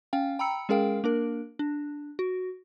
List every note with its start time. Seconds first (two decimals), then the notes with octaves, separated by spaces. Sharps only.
0.13 C#4 F5 G5
0.39 G5 A#5 B5 E6 C#7
0.69 G#3 C#4 G#4 A#4 F5 G5
1.04 A#3 D4 A#4
1.59 D4
2.19 F#4